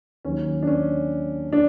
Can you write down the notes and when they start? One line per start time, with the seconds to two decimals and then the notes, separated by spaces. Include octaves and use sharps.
0.25 D#2 D#3 F#3 C#4
0.63 D4
0.67 C#4
1.53 D4